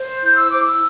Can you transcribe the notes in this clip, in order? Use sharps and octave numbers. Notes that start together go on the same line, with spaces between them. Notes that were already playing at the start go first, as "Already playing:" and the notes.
Already playing: C5
E4 G6
E6
C5 D6
E6